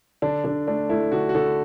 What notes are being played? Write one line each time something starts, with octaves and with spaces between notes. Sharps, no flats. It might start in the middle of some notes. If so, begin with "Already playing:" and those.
D3 D4
D3 D4
A3 D4
A3 E4
D3 F#4
F#4
D3 A4